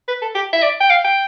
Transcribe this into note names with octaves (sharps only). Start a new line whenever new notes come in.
B4
A4
G4
E5
D5
G5
F5
G5